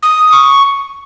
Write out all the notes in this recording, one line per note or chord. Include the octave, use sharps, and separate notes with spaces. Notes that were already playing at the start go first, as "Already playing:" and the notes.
D#6
C#6